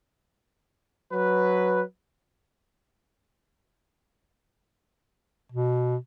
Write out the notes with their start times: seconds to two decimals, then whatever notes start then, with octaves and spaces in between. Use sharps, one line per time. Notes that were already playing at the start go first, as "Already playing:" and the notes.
1.12 F#3 B4
5.52 B2